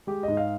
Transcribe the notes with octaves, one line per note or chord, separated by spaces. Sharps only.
G#3 G4
G#2 D#5
F5